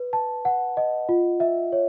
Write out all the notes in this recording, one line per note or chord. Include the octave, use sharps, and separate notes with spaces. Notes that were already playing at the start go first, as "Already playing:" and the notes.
Already playing: B4
A5
F#5
D#5
F4
E5
C#5